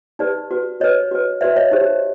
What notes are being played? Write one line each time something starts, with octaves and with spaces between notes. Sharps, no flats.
D#4 G4 B4 D5
F#4 B4
F#4 B4 C#5 D#5
F#4 B4
F#4 B4 D5 E5
C#5 D#5
D#4 G4 C5 C#5